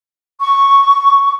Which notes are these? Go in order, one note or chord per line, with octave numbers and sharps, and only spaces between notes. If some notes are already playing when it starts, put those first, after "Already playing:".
C#6